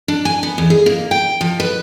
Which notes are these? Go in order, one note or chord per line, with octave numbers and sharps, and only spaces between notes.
D4
G#5
B3
E2
G#4
A#3
G5
F3
B4